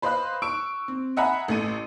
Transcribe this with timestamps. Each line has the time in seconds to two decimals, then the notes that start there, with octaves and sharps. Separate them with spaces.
0.02 B4 C5 D#5 F5 B5 F#6
0.42 C#6 E6 D7
0.88 C4
1.17 D#5 E5 F#5 G#5 A#5 B5
1.48 A1 A3 D#7